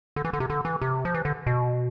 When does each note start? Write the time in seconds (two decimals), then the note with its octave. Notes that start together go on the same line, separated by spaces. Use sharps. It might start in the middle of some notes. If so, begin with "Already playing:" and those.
0.16 D3
0.25 E3
0.33 D3
0.40 C3
0.50 D3
0.65 E3
0.82 C3
1.05 F3
1.14 E3
1.25 D3
1.46 B2